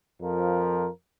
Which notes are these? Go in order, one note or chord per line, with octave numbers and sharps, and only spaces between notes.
F2 F3 A#4